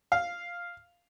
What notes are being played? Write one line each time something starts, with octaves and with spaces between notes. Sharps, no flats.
F5